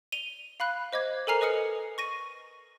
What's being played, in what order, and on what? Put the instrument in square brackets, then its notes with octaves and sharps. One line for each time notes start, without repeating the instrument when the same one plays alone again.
[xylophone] D#7 F7 G7
F5 B5 F#6
C5 D#5 D6 G#6
A4 A#4 G#5 A#5 F6 C7
B4 D#5 D#6 F6 C#7
C#6 A#6 D#7